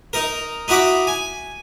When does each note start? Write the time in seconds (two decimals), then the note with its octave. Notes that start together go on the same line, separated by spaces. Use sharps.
0.13 D#4 A#4
0.68 D#4 E4 F#4 B5 D6
1.07 G#5